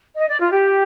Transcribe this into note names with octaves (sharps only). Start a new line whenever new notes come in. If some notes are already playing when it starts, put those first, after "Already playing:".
D#5
D5
F4
G4